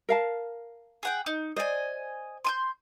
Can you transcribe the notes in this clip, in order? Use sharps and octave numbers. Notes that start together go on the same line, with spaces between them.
A#4 F5 A5
G#4 F#5 G5
D#4
C5 D5 D#5 G#5
C6 D#6 G6